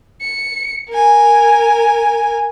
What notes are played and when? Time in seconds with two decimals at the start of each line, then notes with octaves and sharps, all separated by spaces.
0.22 C#7
0.90 A#4 G#5